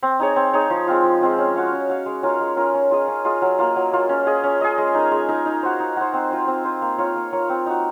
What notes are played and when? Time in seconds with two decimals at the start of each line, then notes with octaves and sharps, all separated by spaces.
0.03 C4
0.20 D#4 G#4 C#5
0.36 C4
0.53 D#4 G#4 C#5
0.70 F3
0.87 G#3 C4 F4
1.04 F3
1.21 G#3 C4 F4
1.38 C#4
1.55 F#4 C#5 F5
1.72 C#4
1.89 F#4 C#5 F5
2.06 G#3
2.23 C#4 F4 A#4
2.40 G#3
2.56 C#4 F4 A#4
2.74 C#4
2.91 F4 G#4 D#5
3.08 C#4
3.25 F4 G#4 D#5
3.42 F#3
3.59 A#3 F4
3.76 F#3
3.93 A#3 F4
4.09 C#4
4.27 G#4 D#5
4.44 C#4
4.61 G#4 D#5
4.78 G#3
4.95 D#4 A#4
5.11 G#3
5.29 D#4 A#4
5.46 D#4
5.63 F#4 C5
5.80 D#4
5.96 F#4 C5
6.13 C4
6.31 F4 C5
6.48 C4
6.64 F4 C5
6.82 A#3
6.98 F4 A#4 C#5
7.16 A#3
7.32 F4 A#4 C#5
7.49 C4
7.66 D#4 F#4